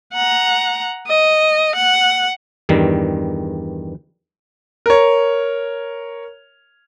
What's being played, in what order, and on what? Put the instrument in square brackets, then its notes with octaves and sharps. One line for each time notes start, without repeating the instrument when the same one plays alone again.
[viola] F#5 A#5
D#5
F#5
[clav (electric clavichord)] E2 G2 D#3 G3
[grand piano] A#4 C#5